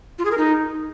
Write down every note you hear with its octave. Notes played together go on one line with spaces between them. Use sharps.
F4
G#4
A#4
D#4